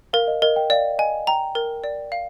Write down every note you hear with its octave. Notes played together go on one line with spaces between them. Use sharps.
A#4 F5
D#5
A#4 D#5
G5
D5 F5
D#5 G#5
G5 A#5
A#4
D5
F5